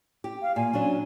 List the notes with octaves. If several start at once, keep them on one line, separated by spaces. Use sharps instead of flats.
G4
F5
A#2 G#5
F#3 C#4 D4